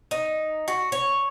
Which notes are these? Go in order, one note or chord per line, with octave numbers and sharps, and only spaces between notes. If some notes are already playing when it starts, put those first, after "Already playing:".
D#4
F#4
C#5